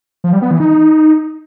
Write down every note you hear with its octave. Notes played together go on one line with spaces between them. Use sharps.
F3
G3
B3
E3
D#4